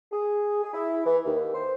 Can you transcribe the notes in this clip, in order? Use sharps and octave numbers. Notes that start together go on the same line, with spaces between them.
G#4
G#4
E4
E3
D#2
C5